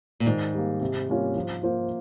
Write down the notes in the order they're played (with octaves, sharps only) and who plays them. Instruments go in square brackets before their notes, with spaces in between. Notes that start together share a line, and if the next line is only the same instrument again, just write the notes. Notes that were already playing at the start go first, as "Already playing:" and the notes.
[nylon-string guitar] A#2
[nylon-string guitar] G#2 [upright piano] D#3
[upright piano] G3 A#3
C3
G3 A#3 C#4 F4
F3
A#3 F4 C5